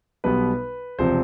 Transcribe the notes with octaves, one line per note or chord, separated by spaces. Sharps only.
B1 B2 G3 B3 B4
E1 C3 F3 C5